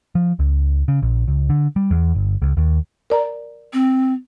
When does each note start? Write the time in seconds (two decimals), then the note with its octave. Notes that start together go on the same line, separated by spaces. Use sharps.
0.15 F3
0.39 C#2
0.88 C#3
1.02 A#1
1.28 C#2
1.49 D3
1.76 G3
1.91 E2
2.15 G1
2.42 C#2
2.57 D#2
3.10 A#4 D5 A#5
3.73 C4